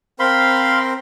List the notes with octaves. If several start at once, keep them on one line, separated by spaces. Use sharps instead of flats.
C4 A#4 C5 F5 B5 C6